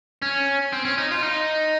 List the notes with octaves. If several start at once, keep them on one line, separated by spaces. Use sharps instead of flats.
C#4
C4
C#4
D#4
F4
D#4